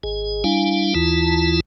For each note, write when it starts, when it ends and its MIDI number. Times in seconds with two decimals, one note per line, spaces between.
0.03 0.44 32
0.03 0.44 68
0.44 0.94 55
0.44 0.94 62
0.44 0.94 64
0.44 0.94 77
0.44 0.94 80
0.95 1.60 39
0.95 1.60 52
0.95 1.60 64
0.95 1.60 65
0.95 1.60 81